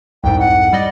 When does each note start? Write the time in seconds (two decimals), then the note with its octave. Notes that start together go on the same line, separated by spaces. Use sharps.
0.24 C2 F2 G#2 G5
0.40 F#5
0.73 G3 D5 D#5